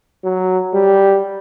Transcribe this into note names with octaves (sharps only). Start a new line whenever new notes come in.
F#3
G3